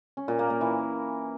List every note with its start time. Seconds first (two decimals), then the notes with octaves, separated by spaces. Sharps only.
0.17 C#4
0.28 A#2
0.39 A#3
0.50 A#3
0.61 E3